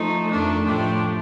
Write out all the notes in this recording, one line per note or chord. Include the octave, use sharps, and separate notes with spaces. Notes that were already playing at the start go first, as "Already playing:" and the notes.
Already playing: F3 A3 D#4
F2 D#3 A3 D4
A2 F3 A3 D4 G4